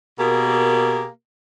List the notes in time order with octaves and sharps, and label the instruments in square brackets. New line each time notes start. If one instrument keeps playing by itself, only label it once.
[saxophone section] B2 A#3 G4 G#4 A#4